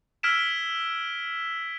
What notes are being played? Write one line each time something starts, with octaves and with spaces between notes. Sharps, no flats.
E6 F6 G#6 B6 D7 E7